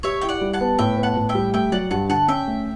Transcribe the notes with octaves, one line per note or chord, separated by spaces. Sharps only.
G4 C#5 E5
E4 G5
D5 F#5
G3
F#5 A5
B3
A2 E5 G5
B3
F#5 A5
A2
E5 G5
G3
A3 E5 G5
F#3 D5 F#5
G2 F#5 A5
D3 F#5 A5
C#4 E5 G5
A3